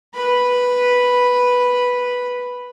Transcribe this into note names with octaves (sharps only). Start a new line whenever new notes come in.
B4 B5